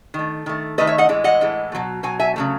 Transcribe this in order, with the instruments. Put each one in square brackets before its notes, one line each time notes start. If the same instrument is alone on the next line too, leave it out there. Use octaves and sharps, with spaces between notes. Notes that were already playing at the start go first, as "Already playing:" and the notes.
[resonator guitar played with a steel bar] D#3 A3
D#3 A3
D#3 A3 B4 D#5
C#5 E5
D#5 F#5
A2 E3 G#3
D#5 F#5
A2 E3 G#3
A3
B2 F#3
B2 F#3 G#5
E5 G#5
C#3 F#3 A3